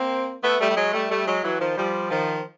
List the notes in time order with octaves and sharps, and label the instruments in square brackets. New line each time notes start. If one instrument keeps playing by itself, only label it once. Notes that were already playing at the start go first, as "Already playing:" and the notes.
Already playing: [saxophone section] A#3 C4
A3 B3
G3 A3
G3
F#3 G#3
G3 A3
G3 A3
F#3 G#3
E3 F#3
D#3 F3
F3 G3
D#3 F3